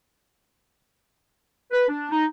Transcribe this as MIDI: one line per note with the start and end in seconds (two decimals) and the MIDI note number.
1.71 1.85 71
1.88 2.08 62
2.11 2.24 63